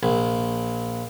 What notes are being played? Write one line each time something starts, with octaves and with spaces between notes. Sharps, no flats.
A#1